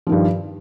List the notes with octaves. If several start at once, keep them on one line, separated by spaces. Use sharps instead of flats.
G2 D#3 F3